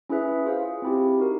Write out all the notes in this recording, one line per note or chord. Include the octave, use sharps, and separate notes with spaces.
C#4 E4 G#4 B4 E5
F4 G#4 C5 F5
C4 E4 G4
D#4 F#4 A#4